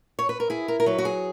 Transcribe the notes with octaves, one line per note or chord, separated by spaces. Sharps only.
C#5
B4
A#4
E4 G#4
A#4
A#4
F#3 B4
F#4
G#4